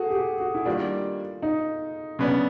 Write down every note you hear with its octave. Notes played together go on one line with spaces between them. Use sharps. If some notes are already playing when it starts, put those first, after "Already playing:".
Already playing: F#4 G#4 A4
G4
F#4
F#4
E4
D#3 G3 A#3 D4 F4
D#4
C#3 F#3 B3 D4